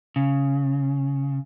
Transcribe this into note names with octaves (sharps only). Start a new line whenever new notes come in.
C#3